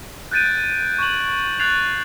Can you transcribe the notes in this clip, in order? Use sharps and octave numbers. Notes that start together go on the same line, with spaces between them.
F#6 G6 A6 D7 D#7
C#6 G#6 E7 F#7
F#6 G#6 A6 C7 F7